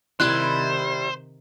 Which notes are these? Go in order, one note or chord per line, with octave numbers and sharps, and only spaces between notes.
C3 D#3 G3 E4 C5 F#6